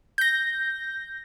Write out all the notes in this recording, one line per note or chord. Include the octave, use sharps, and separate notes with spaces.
G6 A#6